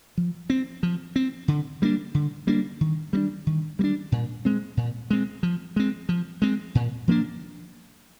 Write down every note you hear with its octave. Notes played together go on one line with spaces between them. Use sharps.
F3
C4
F3
C4
D3
G3 A#3 D4
D3
G3 A#3 D4
D#3
G3 A#3 D4
D#3
G3 A#3 D4
A#2
G#3 C4
A#2
G#3 C4
F3
G#3 C4
F3
G#3 C4
A#2
F3 A#3 D4